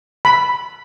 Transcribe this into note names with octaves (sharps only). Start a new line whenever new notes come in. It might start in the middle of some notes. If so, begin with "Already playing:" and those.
B5